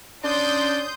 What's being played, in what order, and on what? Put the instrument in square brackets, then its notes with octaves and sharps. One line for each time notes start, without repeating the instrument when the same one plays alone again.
[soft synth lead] C#4 [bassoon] D4 [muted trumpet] D5 [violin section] C6 D#6 G6